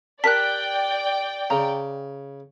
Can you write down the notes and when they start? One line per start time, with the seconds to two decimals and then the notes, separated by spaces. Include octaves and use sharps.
0.24 G4 A#4 D5 G5 A5 F#6 B6
1.50 C#3 A#5